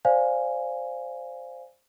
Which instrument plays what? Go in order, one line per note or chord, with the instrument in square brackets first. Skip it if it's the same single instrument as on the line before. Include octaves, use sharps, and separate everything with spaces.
[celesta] C5 D5 F5 G#5